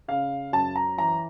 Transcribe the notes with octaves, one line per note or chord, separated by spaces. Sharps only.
C#3 F5
F#2 A5
A#5
E3 A#5